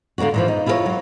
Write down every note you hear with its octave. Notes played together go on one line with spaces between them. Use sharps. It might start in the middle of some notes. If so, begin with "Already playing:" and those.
D3 A#3 B3 D4 F#4
A#2 E3 F3
D#4
E4 F4 G4 A4 A#4 C#5
F#3 F4